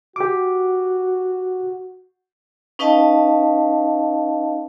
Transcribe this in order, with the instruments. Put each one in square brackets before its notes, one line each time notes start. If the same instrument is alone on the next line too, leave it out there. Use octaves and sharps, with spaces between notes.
[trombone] F#4 [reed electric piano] G4 D6
[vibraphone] C#4 D#4 B4 D#5 F5 A5